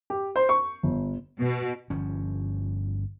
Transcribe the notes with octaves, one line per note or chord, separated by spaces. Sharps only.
G4
C5
C#6
G1
B2
G1 F3 C#4